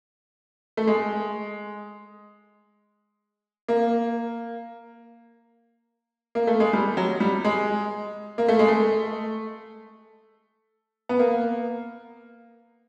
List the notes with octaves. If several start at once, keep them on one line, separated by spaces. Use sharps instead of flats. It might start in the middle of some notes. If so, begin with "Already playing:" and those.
A3
G#3
A#3
A#3
A3
G#3
G3
F#3
G3
G#3
A#3
A3
G#3
A3
B3
A#3